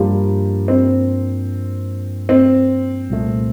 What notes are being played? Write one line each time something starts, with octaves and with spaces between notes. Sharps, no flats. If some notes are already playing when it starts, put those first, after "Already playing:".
Already playing: G2 F3 G3 A#3 D4 F4
C4
C4
C2 A#2 A3